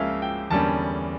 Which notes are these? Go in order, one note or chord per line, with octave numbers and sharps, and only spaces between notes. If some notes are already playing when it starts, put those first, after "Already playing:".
Already playing: C#2 C#3 F3 A#3 C#4 E5 F5
G5
E2 D3 G3 A#3 C#4 A5